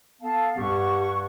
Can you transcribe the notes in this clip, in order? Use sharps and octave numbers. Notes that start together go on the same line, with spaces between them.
B3 A4 F5 A5
G2 G4 F#5 C#6